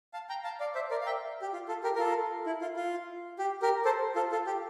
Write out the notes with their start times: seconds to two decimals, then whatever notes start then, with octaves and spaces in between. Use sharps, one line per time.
0.13 F5 A5
0.29 G5 A#5
0.44 F5 A5
0.60 D5 F5
0.75 C5 E5
0.91 A#4 D5
1.01 F5
1.06 E5 G5
1.42 G4
1.53 F4
1.68 F4 A4
1.83 G4 A#4
1.96 A#4
1.99 F4 A4
2.46 E4
2.61 F4
2.77 F4
3.39 G4
3.62 G4 A#4
3.85 A4 C5
4.16 F4 A4
4.31 F4 A4
4.47 G4